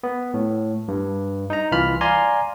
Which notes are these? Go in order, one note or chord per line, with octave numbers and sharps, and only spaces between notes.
B3
A2
G2
D#4 A#5
C2 E3 F4 B5 F6
D5 F5 G#5 A#5 C6